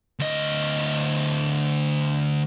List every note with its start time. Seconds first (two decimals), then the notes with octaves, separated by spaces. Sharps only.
0.19 D2 D#5